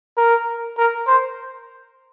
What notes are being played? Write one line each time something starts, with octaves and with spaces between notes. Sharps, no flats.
A#4
A#4
C5